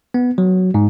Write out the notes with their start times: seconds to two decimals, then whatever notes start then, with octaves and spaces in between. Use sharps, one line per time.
0.14 B3
0.38 F#3
0.74 G#2